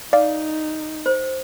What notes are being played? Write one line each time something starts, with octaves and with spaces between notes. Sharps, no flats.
D#4 D5 F5
C5